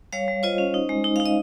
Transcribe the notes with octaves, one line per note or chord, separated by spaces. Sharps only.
G3 C#5 F5
G3
F4 C5 D#5
C#4
D#4
G#3
D#4
D#4 F5
D#5